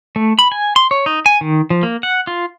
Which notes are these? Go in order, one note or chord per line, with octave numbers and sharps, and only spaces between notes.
A3
B5
G#5
C6
C#5
D#4
G#5
D#3
F3
A#3
F#5
F4